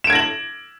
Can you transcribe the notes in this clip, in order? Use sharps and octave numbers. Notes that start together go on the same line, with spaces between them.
G#6 A#6 D7 E7 F#7